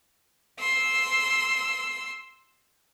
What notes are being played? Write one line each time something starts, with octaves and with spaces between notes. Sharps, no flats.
C6 E6